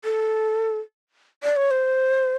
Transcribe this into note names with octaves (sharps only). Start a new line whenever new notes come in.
A4
D5
C#5
C5